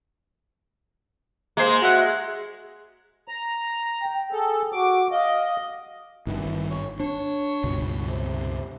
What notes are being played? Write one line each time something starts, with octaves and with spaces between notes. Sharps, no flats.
G#3 A#3 C5
F#4 E5 F#5
A#5
G5
G#4 A4
F#4 D6
D#5 F5
G#1 G2 D#3 E3
C#5
D4 C#5
C#2 G2 B2
C3